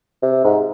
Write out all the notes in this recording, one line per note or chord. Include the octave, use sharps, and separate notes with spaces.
C3
G#2